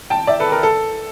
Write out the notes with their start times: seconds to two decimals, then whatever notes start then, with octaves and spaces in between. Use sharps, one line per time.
0.10 G5 A5
0.27 D5 E5
0.40 A4 B4
0.52 A#4
0.63 A4